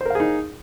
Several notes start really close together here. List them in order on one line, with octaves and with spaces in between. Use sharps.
C5 A#4 F5 G#4 D#4